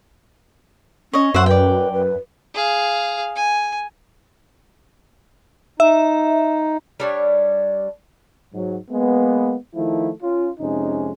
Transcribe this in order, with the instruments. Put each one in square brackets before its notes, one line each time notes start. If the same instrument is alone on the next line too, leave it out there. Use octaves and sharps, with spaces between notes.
[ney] C#4 [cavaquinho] C#5 D#5
[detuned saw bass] F#2 [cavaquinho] C5 E5 F#5 [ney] C#6
[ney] B4 [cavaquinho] D5 G5
[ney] B4
[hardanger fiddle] G#4 F5
G#5
[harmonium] D#4 [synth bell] E5
[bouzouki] G3 D4 C#5
[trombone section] G#2 F#3
G#3 A#3 B3
D#3 F3 A3 E4
C#4 F4
F2 C3 G#3 C#4 D#4